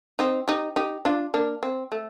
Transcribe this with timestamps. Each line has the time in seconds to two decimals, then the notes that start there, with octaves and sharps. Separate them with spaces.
0.19 C4 D#4
0.48 D#4 G4
0.76 D#4 G4
1.05 D4 F4
1.34 A#3 D4
1.63 C4
1.92 A3